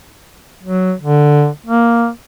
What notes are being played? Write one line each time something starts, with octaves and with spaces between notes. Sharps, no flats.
F#3
D3
A#3